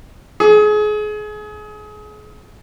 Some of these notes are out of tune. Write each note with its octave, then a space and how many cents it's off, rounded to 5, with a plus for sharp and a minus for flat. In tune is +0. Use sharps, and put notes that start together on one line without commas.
G#4 +30